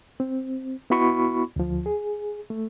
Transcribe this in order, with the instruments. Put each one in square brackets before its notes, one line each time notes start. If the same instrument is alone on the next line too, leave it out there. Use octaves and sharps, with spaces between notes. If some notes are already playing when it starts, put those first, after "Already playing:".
[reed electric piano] C4
B3 E4 F#4 B5 C#6
D2 F3
G#4
A3